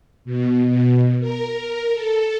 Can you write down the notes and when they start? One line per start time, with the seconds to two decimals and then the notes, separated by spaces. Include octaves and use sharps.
0.25 B2
0.69 B2
1.20 A#4
1.92 A4